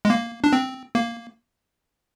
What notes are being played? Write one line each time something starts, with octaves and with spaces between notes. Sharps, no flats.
G#3
A#3
D4
C4
A#3